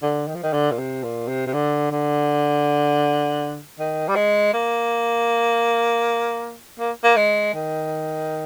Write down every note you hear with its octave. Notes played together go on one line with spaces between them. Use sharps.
D3
D#3
F3
D#3
D3
A#2
C3
A#2
C3
C3
D3
D3
D#3
G3
G#3
A#3
A#3
A#3
G#3
D#3